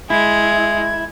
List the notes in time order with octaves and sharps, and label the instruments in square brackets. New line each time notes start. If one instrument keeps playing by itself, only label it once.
[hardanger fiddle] G#3 [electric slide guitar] E4 [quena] G#6